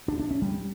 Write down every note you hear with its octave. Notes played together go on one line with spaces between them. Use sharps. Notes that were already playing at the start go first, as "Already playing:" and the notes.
D4
D4
C#4
G3